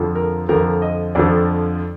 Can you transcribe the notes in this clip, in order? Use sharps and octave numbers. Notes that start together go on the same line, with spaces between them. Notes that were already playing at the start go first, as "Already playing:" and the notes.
Already playing: F2 D3 F3
A#4
F2 D3 F3 A#4
D#5
F2 D3 F3 D5